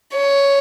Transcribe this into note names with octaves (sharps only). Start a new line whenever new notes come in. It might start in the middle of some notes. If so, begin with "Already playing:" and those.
C#5